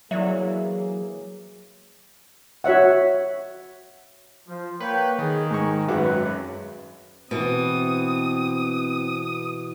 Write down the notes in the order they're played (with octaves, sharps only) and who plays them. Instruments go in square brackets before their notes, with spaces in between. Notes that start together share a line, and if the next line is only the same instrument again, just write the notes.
[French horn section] E3 A#3 G#4 [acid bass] F#3 [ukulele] E4 D5 E5
[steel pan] F#4 C#5 E5 F#5
[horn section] F3
[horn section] A#3 C#5 G5 [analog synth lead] B4
[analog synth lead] D#3 [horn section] G#4
[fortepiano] G#2 C#6
[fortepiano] G#1 F#4 D6 [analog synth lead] F#2 [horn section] G#3 C4 B4
[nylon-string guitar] B2 E3 [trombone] C4 [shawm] D#6